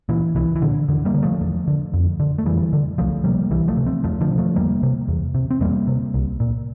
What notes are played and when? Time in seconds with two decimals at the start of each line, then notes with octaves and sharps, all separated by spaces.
0.09 A#2 E3
0.35 C2 E3
0.56 E3
0.62 A#2 D3
0.88 E2 D3
1.05 G3 A#3
1.14 D3
1.23 F3 A3
1.41 E2
1.68 D3
1.94 F2
2.20 D3
2.38 A3
2.45 F2 E3 G3
2.73 D3
2.98 C2 F3 A3
3.24 C3 G3 A#3
3.51 C2 E3 G3
3.68 F3 A3
3.77 C3
3.86 A3 C4
4.04 E2 F3 A3
4.21 D3 F3
4.30 C3
4.38 F3 A3
4.56 E2 G3 A#3
4.83 C3
5.08 E2
5.35 C3
5.51 C4
5.61 E2 G3 A#3
5.87 C3
6.14 C2
6.40 A#2